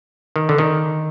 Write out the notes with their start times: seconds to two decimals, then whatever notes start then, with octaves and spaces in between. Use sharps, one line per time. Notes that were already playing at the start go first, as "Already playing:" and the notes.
0.36 D#3
0.49 D3
0.58 D#3